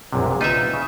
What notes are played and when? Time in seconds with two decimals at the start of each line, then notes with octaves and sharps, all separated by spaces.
0.13 A#1 F#2 C3
0.26 A#2
0.41 D#4 F4 B4 E5
0.74 C#3